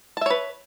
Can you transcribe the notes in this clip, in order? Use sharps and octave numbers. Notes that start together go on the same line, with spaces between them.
B4 C#5 E5 A5